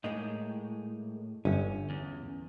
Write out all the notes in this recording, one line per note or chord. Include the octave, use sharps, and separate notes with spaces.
A2 G#3 A#3 D#4
G1 C#4
E2